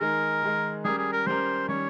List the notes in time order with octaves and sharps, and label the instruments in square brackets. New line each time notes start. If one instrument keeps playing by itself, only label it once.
[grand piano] D#3 G#3 D#4 G#4 [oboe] A#4
[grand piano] D#3 G#3 D#4 G#4
[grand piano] G3 C#4 G4 A#4 [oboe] G#4
[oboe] G#4
A#4
[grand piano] G3 C#4 G4 A#4 [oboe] C5
[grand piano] D#3 G3 C#4 [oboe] C#5